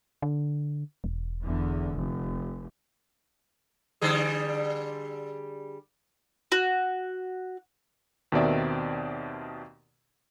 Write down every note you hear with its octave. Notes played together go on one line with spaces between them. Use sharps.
D3
E1
E2 D3
F1
D3 G3 G#4
F#4
D#2 B2 D#3 C4 D5 E5